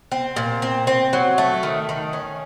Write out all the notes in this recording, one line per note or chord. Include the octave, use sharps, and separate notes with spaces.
C4
A#2
C4
C4
F#3
A3
D#3
D#3
C#4